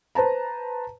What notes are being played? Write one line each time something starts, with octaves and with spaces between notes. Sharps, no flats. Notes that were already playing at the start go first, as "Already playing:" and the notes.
B4 C5 A5 A#5